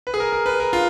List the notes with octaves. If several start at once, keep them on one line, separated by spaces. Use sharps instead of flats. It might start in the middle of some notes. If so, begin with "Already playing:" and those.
B4
G#4
A#4
A#4
B4
A#4
F4